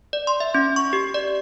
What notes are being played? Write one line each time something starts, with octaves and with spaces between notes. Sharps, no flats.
D5
C6
E5
C#4
C#6
G4
D5